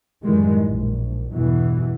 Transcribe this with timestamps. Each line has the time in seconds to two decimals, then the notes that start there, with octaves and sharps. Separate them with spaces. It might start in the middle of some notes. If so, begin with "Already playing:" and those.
0.23 F#2 A2 D#3 E3 G3 G#3
0.64 A#1
1.33 G1 E2 B2 E3